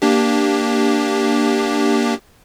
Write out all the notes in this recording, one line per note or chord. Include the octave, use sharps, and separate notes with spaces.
A#3 D4 G4